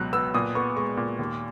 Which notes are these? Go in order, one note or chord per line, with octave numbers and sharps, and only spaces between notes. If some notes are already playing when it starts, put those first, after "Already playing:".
Already playing: C#2 B2 F#3 F#6
B3 E6
A#2 D#6
B3 C#6
G#3 C#6
A#2
D#2